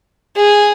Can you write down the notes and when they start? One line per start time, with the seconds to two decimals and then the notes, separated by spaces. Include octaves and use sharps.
0.36 G#4